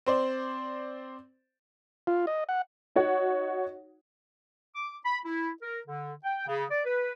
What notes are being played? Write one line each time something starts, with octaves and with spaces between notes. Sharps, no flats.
C4 C5 D5
F4
D#5
F#5
D#4 F#4 C#5 F#5
D6
B5
E4
A#4
D3
G5
C#3
D5
B4